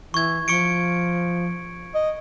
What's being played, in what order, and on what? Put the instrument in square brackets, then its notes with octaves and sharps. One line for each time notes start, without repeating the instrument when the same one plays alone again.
[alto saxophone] E3 [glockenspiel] C#6 G#6
[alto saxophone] F3 [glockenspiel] C#6 C#7 D7
[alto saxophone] D#5